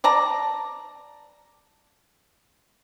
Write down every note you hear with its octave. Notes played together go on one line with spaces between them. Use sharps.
D5 A5 A#5